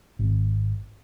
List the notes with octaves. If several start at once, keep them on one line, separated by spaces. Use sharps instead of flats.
G#1